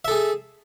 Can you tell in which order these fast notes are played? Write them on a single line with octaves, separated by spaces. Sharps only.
E5 A4 G#4